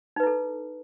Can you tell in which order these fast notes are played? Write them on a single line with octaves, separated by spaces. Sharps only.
D#4 B4 E4 A4